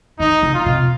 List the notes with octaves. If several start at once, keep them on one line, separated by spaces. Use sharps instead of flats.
D#3 D#4
C#3
F4
C3